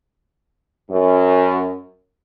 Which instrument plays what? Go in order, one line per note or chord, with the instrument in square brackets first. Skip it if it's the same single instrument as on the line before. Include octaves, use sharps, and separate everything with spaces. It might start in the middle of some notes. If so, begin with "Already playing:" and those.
[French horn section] F#2